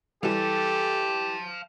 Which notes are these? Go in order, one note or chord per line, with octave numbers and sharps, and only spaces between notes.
E3 G3 G4 A4 F5 A5